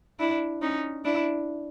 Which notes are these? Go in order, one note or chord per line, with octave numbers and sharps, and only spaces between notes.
D4 E4
C#4 D#4
D4 E4